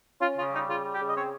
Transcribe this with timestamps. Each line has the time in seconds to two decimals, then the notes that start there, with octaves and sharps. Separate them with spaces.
0.20 C#4 F4
0.36 C#3 F4
0.52 G3 D#4
0.68 C#3 F4
0.84 G3
0.92 G4
1.00 C#3
1.07 D#5
1.16 C4 C#5